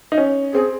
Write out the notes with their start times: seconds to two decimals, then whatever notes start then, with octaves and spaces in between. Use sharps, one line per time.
0.12 D#4
0.18 C#4
0.54 C4 G#4